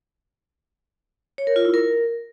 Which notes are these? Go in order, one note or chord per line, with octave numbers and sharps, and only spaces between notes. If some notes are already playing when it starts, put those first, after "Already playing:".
C#5
A#4
F4
E4
A#4